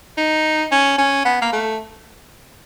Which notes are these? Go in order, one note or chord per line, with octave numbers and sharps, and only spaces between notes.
D#4
C#4
C#4
B3
A#3
A3